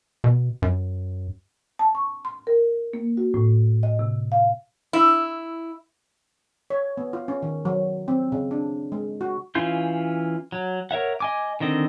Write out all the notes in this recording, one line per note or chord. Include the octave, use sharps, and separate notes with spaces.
B2
F#2
A5
C#6
C6
A#4
A#3
F#4
A2
D#5
C3
F5
E4
C#5
B3
F4
C#4
D#3
F#3
C4
C#3
D4
G#3
F#4
E3 C#4 F4 C6 G6
F#3
A#4 C#5 E5 F#5
D#5 G#5 D6
D3 D#3 C4 D#5